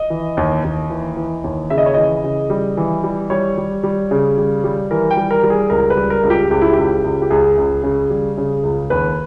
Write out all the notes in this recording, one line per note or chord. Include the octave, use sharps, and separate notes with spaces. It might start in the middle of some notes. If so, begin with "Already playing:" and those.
Already playing: D#5
E3
D#2
D#2
E3
E3
D#2
C#3 E5
D#5
C#5
E3 D#5
C#3
G3
E3
G3
G3 C#5
G3
G3
C#3
G3
G3
E3 A#4
G5
G3
A#4
G3
G#4
C#2 A#4
B4
G3
A#4
C#2
G4
C#2 G4
E4
C#2 G4
C#2
G4
C#2 G#4
C#2
C#3
G3
C#3
C#2
D#2 B4